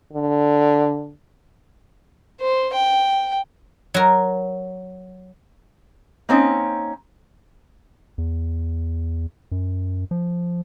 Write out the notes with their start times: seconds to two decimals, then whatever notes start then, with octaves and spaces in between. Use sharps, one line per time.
0.13 D3
2.40 C5
2.73 G5
3.94 F#3 A#4
6.29 A#3 C4 C#4 D#4
8.18 E2
9.52 F#2
10.11 F3